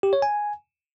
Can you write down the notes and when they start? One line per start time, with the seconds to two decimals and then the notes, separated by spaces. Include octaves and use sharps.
0.03 G4
0.13 C#5
0.22 G#5